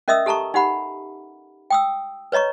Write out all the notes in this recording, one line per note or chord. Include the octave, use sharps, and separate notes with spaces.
C#4 A#4 D#5 E5 D#6 E6
G4 A4 A5 A#5 C#6
D#4 G4 F#5 B5
G5 D#6 E6
B4 C#5 D#5 A#5 C#6